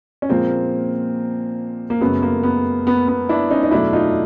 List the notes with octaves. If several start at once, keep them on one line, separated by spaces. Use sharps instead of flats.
C#4
A#2 F3 G#3 A#3 C4
A#3
F#2 C#3 F#3 A3 B3
A#3
B3
B3
B3
D4 E4
C#4 D#4
D#4
E2 B2 F#3 A3 D4 E4
D#4 F4